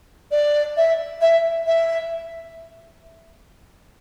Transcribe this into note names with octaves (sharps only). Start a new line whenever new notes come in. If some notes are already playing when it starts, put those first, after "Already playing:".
D5
E5
E5
E5